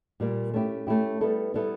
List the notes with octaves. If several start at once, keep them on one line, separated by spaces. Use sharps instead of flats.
A#2 G3 A#3
A3 C#4 E4 G4
A3 C#4 E4 G4
G3 B3 E4 A4
G3 B3 E4 A4